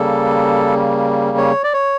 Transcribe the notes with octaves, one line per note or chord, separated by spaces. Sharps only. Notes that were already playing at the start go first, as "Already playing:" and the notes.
Already playing: C#3 G3 A#3 A4
C#5
D5
C#5